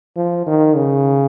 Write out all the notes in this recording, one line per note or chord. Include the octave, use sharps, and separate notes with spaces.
F3
D#3
C#3